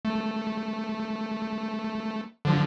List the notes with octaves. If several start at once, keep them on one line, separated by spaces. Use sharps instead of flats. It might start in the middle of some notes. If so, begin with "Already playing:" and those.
A3
D3 F3